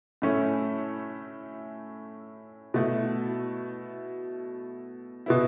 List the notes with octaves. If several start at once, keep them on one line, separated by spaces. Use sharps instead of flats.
A2 A3 C#4 E4
B2 A3 E4
B2 B3 E4